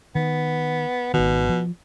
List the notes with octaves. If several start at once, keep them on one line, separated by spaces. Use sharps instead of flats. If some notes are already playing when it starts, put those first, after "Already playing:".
D#3 B3
G#1 B2 D#3
F3